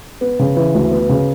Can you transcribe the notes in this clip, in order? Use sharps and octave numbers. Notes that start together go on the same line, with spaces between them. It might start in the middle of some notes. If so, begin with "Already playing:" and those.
B3
C#3
E3
D2
B3
C#3